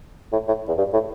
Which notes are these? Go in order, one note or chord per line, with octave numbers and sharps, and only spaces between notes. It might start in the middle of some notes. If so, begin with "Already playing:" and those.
A2
A2
E2
G2
A2